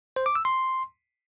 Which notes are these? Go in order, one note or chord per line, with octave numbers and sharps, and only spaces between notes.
C5
D6
E6
C6